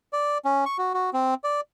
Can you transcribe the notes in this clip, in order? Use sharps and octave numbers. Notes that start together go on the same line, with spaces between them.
D5
C#4
C#6
F#4
F#4
C4
D5